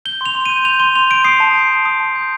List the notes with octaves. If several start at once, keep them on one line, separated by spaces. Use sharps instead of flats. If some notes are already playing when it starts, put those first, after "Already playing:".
G6 G7
C6 F7
C6
G6 D#7
G6 F7
C6 G7
C6 F7
G6 D7
D#6 C7
A5
G6
A5
D#6
A5
G6